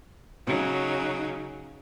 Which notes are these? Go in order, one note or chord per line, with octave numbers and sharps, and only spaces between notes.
C#3 F#3 D#4